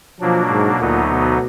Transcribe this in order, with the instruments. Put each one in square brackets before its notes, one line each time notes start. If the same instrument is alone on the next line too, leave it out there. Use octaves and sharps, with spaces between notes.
[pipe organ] B2 F#3 A#3 D4 [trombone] F3
[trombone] G#2
[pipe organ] D2 D3 F#3 B3 D#4 [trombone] A#2
[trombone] B2